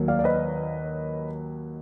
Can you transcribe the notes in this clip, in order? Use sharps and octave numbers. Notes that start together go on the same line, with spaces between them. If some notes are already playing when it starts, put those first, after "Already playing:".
Already playing: D#2 D#3 F#3
D5 F5
D5
B4 D#5